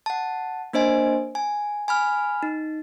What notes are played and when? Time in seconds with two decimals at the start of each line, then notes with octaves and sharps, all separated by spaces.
0.06 F#5 A5
0.73 A#3 D4 C5 D#5 G#5
1.35 G#5
1.88 G#5 B5 F6
2.43 D#4